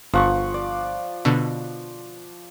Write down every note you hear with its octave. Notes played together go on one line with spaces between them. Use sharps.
G1 F3 F#5 C#6
D5
B2 D3